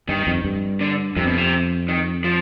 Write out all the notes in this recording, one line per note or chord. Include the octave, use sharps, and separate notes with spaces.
G2 D#3
F2
G2
D3
F2 C3
B2
C3
D#3
F3